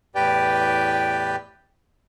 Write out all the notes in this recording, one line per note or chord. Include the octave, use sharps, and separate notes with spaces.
E2 A2 G4 B4 D5 G5